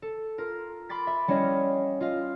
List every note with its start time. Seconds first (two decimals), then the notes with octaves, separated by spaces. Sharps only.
0.02 A4
0.38 F4 A#4
0.89 B5 C6 D6 A6 B6
1.07 E5
1.28 G3 C#4 E4 C#5 D#5 F5
2.00 F4 D#5 F5